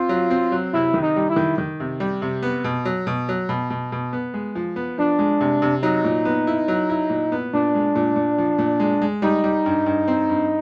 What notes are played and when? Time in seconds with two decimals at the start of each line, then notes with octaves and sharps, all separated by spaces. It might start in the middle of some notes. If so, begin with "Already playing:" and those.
Already playing: C4 F4
0.09 F#3
0.30 C4
0.52 F#3
0.73 C3 E4
0.94 D#3
1.02 D#4
1.16 G3
1.30 E4
1.36 D#3
1.58 D#3
1.80 C3
2.00 G3
2.22 C3
2.43 B3
2.64 B2
2.85 F#3
3.07 B2
3.29 F#3
3.49 B2
3.70 B2
3.92 B2
4.13 B3
4.34 G#3
4.55 F3
4.76 B3
4.98 F3 D4
5.19 G#3
5.41 C3
5.62 C3
5.82 F#3 D#4
6.04 A#2
6.25 B3
6.47 E4
6.68 F#3
6.90 E4
7.10 A#2
7.32 B3
7.53 A#2 D4
7.75 G#3
7.95 A#2
8.16 A#2
8.38 F3
8.58 A#2
8.80 G#3
9.01 G#3
9.22 G3 D#4
9.44 G3
9.66 G2
9.86 G2
10.08 C4
10.29 G2